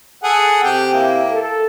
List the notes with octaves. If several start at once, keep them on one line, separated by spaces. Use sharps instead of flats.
G#4 A4 F#5
C3 G4 G5
A#3 E4
A4